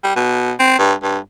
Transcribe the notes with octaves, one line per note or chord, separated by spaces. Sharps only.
G3
B2
C4
G2
G2